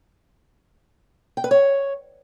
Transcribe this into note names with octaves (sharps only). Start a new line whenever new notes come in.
G5
B4
C#5